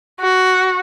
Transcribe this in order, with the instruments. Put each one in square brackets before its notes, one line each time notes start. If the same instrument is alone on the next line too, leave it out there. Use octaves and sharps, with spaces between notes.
[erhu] F#4